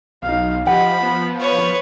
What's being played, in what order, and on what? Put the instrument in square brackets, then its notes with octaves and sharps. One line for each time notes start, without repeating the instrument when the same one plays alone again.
[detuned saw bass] B1 [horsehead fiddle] D#4 F5
[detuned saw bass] F3 [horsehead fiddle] G4 D#5 [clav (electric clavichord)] F#5 [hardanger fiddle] B5
[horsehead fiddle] B3
[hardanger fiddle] B4 C#5